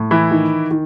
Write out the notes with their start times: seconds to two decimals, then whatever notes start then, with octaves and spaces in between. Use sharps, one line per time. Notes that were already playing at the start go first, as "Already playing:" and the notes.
Already playing: A2
0.11 E3 E4
0.31 D#3
0.71 D#3